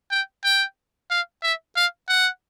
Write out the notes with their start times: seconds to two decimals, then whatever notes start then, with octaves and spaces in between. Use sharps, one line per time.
0.11 G5
0.44 G5
1.11 F5
1.43 E5
1.76 F5
2.09 F#5